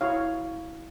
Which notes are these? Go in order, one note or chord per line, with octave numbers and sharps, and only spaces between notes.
E4 F#4 C#5 F5